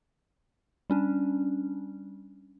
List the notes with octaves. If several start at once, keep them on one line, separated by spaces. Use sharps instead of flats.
G3 C#4 D4